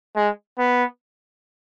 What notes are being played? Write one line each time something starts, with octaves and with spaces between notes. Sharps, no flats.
G#3
B3